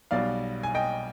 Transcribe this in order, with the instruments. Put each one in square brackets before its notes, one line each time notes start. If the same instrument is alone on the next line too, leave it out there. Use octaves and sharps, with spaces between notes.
[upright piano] B1 B2 G3 D5 F5
G#5
D#5 G5